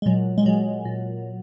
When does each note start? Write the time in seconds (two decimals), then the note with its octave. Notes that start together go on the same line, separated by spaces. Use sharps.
0.02 G#3
0.06 A#2 F#3
0.38 G#3
0.46 A#2 F#3
0.85 A#2